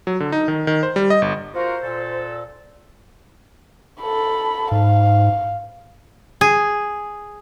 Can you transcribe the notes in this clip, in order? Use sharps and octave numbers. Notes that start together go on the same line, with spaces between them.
F#3
D3
D#4
D#3
D#3
C5
G3
D#5
G1
F4 F#4 A#4 C5
A#2 A4
A4 B5
G#2 F5
G#4